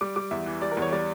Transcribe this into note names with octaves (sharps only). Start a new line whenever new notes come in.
G3 D6
G3 D6
E2 E5
E3
G3 D5
A#4
E2
C#5
G3 D5